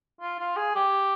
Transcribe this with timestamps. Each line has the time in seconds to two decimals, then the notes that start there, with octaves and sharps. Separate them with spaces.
0.21 F4
0.39 F4
0.56 G#4
0.75 G4